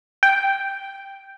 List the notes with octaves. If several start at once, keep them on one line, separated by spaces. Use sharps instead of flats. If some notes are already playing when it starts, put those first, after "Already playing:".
G5